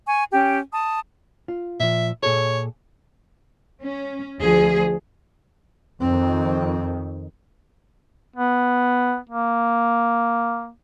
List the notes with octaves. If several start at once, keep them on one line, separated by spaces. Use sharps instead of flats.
G#5 C#6
C#4 G4 G5
A5 D#6
F4
A#2 F3 E5
A#2 G#4 A4 C#5
C#4
D2 F3 G#4
F2 D#3 C4
B3
A#3